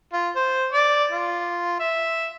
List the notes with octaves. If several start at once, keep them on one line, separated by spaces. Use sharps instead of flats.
F4
C5
D5
F4
E5